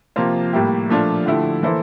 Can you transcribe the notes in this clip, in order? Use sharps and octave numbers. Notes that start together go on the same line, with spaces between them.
C3 F3 A#3 F4 C5
A2 G3 A#3 E4 G4
A#2 F3 A3 D4 F4
D3 F3 A3 E4 G4
E3 A#3 E4 A4 C5